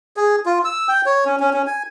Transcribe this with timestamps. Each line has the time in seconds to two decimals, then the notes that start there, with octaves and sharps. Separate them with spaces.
0.17 G#4
0.46 F4
0.65 E6
0.88 G5
1.06 C#5
1.25 C#4
1.40 C#4
1.54 C#4
1.67 G#5